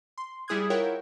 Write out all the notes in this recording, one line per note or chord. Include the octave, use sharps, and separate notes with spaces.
C6
G3 E4 G#4 D#6 F#6 G#6
E4 F4 A#4 C#5 F#5 G5